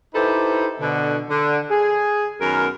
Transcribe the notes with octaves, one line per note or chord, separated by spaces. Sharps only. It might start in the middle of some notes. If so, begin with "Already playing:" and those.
D#4 E4 G4 A4 B4 C5
B2 D3
D3
G#4
F#2 D#3 B3 A#4